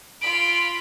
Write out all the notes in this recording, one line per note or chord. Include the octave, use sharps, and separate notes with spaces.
F4 B5 D7